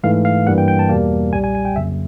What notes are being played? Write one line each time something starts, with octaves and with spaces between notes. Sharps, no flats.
G#2 E3 A3 F5
F5
G2 E3 G3 A#3 F#5
G5
G5
A5
E2 B2 G3 A#3
B1 A#2 G3 G#5
G#5
G#5
G5
F2 C#3 F#3 A#3 E5